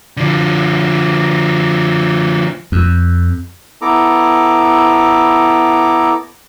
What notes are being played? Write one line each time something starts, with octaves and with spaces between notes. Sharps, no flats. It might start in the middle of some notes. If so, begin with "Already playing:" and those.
D3 F3
F2
B3 E4 A4 A#5 D6